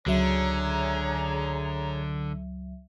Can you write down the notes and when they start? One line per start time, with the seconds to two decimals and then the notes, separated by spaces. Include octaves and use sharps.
0.06 C#2 D3 F#3 G#4 C#5 E5 A#5